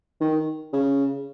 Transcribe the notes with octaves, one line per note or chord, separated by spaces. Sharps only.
D#3
C#3